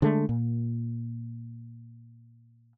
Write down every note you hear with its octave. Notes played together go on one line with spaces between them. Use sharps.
D3 G#3 A3
A#2